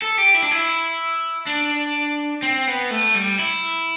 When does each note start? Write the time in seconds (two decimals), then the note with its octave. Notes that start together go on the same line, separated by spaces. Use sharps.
0.02 A4
0.18 G4
0.34 E4
0.43 D4
0.51 E4
1.47 D4
2.42 C4
2.67 B3
2.91 A3
3.15 G3
3.39 E4